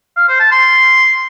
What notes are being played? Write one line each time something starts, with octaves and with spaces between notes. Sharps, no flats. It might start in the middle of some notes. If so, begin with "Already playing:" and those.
F5
C5
A5
C6